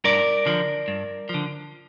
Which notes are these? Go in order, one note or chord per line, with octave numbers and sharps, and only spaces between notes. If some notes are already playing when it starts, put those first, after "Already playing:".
G2 A#4 D5
D3 F3
G2
D3 F3